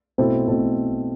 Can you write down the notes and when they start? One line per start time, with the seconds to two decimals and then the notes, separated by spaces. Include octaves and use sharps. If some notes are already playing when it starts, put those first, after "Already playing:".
0.18 B2 A3 C4 E4 A4
0.48 B2 A3 C4 E4 A4